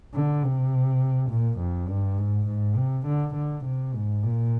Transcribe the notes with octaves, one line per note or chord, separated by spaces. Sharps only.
D3
C3
A#2
F2
G2
G#2
G#2
C3
D3
D3
C3
G#2
A#2